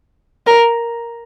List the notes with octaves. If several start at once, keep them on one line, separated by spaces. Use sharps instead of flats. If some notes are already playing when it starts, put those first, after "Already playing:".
A#4